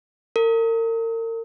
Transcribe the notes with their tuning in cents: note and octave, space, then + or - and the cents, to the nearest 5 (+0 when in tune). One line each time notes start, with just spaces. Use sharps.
A#4 -40